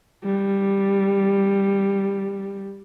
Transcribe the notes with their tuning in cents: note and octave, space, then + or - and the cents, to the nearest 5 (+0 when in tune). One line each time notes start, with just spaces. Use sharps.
G3 +5